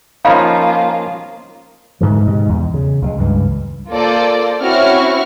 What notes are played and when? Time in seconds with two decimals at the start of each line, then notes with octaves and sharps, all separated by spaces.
0.25 F3 A#3 C#4 D#4 F4 F5 B5
2.01 G#2 B2 D3 E3
2.27 G#2 C3 G#3
2.49 E2
2.74 C#3
3.02 C#2 G3 G#3
3.18 C#2 G2 E3
3.89 A#3 F4 A4 C5 D5
4.61 C4 C#4 E4 F#4 C#6 F6